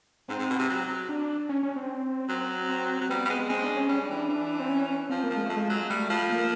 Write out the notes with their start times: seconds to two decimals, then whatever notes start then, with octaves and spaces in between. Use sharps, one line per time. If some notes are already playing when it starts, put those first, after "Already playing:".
0.29 G#2 C4
0.39 G#2
0.50 B2
0.59 C3
0.70 F#3
1.09 D4
1.49 C#4
1.63 C#4
1.76 C4
2.29 F#3
2.69 C4
3.01 F#3
3.09 G3 B3
3.25 G3
3.29 G#3
3.49 G#3 C4
3.62 D4
3.76 C#4
3.89 G3 C#4
4.03 D4
4.10 E3
4.17 D4
4.29 E3 D4
4.60 C4
4.69 C#4
5.10 F3 C4
5.24 A#3
5.30 F3
5.36 G#3
5.46 F3 A3
5.57 G#3
5.69 F#3
5.90 G3 A3
6.10 F3
6.30 A#3